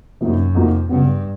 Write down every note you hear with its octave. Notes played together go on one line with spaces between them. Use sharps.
F#2 C3 F3 A#3 D#4 F#4
F2 C3 F3 A#3 D#4 F#4
G2 C#3 F#3 B3